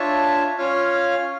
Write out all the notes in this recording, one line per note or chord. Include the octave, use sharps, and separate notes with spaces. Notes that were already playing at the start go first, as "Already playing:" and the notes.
Already playing: D4 F4 C#5 E5 A5
C#4 F4 C#5 F5